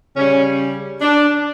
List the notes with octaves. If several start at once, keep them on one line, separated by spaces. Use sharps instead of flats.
C#3 G3 C#4
D4